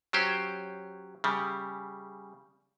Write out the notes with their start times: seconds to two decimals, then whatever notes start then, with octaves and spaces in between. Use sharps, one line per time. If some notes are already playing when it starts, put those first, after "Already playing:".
0.13 F#3 C#4 G4 C5
1.24 C#3 G3